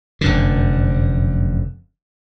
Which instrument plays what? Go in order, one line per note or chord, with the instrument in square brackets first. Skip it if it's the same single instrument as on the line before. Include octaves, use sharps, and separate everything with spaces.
[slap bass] F1 F#2 D3